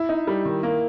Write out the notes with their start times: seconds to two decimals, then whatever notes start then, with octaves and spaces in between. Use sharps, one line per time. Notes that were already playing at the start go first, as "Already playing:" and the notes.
Already playing: E4
0.09 D#4
0.27 G3
0.45 D#3
0.63 A#3